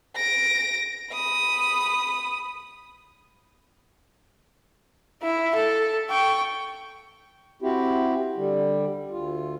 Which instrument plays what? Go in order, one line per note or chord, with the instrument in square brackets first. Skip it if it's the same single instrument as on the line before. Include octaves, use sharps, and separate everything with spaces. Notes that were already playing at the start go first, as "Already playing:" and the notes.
[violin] A#6 D7
B5 D#6
[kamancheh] E4
A4
G5 C#6
[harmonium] C4 E4 F#4 G4
D3 G3
D2 F4